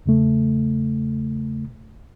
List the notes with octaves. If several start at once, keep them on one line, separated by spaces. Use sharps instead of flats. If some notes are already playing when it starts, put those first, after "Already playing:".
E2 C#3 A3